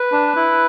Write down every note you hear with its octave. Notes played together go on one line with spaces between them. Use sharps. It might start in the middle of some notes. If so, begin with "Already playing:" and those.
Already playing: B4
D4
E4